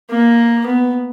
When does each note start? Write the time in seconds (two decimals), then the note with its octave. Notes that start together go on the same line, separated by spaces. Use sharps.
0.10 A#3
0.67 B3